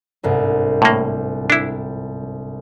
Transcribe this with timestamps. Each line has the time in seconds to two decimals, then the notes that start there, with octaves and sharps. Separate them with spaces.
0.23 G1 C2 G#2
0.82 A2 A#3
1.50 D4 E4